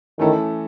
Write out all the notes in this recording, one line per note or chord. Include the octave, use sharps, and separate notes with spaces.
D#3 E3 A3 C#4 E4 A4